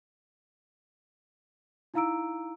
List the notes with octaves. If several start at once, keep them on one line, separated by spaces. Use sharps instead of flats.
D#4 E4 F5 A#5 E6 D7